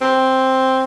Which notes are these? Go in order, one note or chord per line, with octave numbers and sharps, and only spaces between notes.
C4